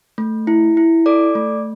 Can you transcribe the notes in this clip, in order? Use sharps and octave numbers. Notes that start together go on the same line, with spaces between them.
A3
E4
E4
A4 D5 D6
A3